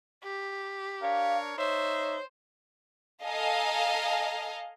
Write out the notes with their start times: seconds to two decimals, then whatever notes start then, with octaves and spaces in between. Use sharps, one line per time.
0.23 G4
1.02 D4 A#4 C#5 F5
1.58 D#4 C5 C#5 E5
3.23 A4 D#5 F5 G#5 A#5